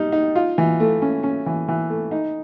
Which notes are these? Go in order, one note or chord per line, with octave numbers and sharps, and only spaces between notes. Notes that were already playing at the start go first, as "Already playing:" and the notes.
Already playing: G3 D#4
D#4
F4
E3
A3
C#4
C#4
E3
E3
A3
D#4